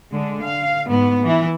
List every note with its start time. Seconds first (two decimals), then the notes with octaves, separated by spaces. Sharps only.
0.12 D3 G#3
0.43 F5
0.88 G#2 B3
1.23 E3 E4